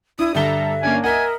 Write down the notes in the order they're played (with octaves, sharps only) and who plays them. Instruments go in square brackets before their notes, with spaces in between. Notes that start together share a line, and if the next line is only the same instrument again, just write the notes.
[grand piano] D4 [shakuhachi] E4 [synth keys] D#6
[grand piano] G2 D3 G7 [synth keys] G3 A4 A#5 [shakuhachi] E5
[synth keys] A#3 C#4 D4 [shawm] G#5
[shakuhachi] A#4 [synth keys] D#5 E5 [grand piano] F#5 B6 [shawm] G#5